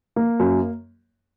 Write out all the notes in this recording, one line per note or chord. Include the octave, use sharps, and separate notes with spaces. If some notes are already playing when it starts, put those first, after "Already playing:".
A#3
F#2